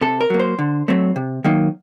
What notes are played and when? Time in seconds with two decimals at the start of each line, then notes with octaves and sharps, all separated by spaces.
0.01 C3 A4
0.21 A#4
0.30 F#3 A#3
0.40 C5
0.59 D3
0.88 F#3 A3 C4
1.16 C3
1.44 D#3 F#3 A#3 D#4